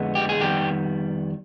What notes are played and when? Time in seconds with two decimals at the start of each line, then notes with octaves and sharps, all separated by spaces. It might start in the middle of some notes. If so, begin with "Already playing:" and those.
Already playing: F2 D3 G#3 B3
0.15 G4
0.29 G#4
0.39 F2 D#3 G3 B3 G4